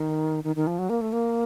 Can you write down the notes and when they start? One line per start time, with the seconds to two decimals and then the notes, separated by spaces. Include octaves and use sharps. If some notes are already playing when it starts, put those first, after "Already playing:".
Already playing: D#3
0.44 D#3
0.56 D#3
0.67 F3
0.79 F#3
0.90 A#3
1.01 A3
1.13 A#3